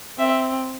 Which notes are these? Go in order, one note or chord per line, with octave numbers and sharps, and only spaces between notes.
C4 E5